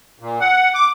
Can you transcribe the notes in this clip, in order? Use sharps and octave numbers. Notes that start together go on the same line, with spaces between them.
A#2
F#5
D6